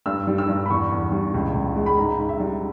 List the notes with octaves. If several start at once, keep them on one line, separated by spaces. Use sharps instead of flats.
G2 E6
G3
E6
G2
B5
E2 C#6
E2
G3
C#2
C#2
G#3
B5
G#2 A#5
G#2
E5
G3